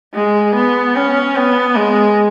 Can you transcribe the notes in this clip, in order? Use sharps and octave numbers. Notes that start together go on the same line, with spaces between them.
G#3
B3
C#4
B3
G#3